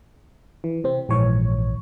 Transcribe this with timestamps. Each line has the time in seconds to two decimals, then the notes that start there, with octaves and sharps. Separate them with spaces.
0.64 E3
0.84 C3 C4
1.09 A#1 G#2 E3 C#5